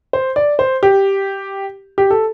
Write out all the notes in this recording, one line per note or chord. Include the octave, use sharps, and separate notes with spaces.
C5
D5
C5
G4
G4
A4